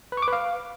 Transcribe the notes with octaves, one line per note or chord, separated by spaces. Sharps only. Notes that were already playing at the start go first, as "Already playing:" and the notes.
B4
C#6
D6
B4
F5